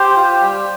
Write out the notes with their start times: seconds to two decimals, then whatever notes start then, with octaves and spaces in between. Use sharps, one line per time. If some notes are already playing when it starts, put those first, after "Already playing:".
Already playing: G4 C5
0.16 F4
0.41 G3